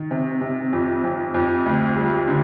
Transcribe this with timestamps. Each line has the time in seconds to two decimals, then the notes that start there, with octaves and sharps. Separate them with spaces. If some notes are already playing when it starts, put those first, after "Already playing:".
Already playing: D#3
0.11 C3
0.41 C3
0.73 F2
1.04 F2
1.34 F2
1.66 D2
1.97 G3
2.28 D3